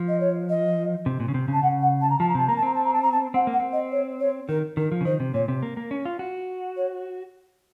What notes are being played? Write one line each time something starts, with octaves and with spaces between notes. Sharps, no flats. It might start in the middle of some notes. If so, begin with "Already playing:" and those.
Already playing: F3
D#5
C#5
D#5
C3
A#2
C#3
C3
C#3 A5
C#3 F#5
F#5
A5
A#5
F3 A5
A#5
C3 A5
A#3 A#5
A5
C4 A#5
A5
A#5
A5
A#5
A5
C4 F#5
A#3
F#5
C4
D#5
C#5
C#5
D#3 A#4
D#3 A#4
F3
C#3
D#3 C5
C3
A#2 C#5
C3
A#3
A#3
C#4
F4
F#4
C#5